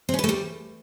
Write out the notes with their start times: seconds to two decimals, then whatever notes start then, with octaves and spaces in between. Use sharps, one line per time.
0.09 C4
0.14 C#4
0.19 B4
0.24 A3
0.29 G3